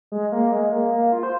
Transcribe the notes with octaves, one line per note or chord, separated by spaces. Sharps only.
G#3
A#3
G#3
A#3
A#3
F4
C5